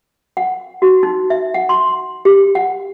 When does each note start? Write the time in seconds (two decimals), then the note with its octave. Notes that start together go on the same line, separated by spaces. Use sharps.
0.37 F#5
0.82 F#4
1.03 D#4
1.30 E5
1.54 F#5
1.69 C6
2.25 G4
2.55 F#5